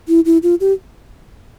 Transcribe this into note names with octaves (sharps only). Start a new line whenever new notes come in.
E4
E4
F4
G4